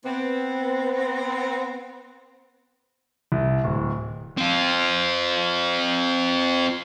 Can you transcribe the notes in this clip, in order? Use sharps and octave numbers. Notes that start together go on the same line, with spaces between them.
B3 C4
C2
D1
C4 F4